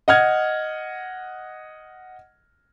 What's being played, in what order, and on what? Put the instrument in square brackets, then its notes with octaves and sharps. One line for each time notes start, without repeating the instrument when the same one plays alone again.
[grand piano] D#5 F#5 F6 G#6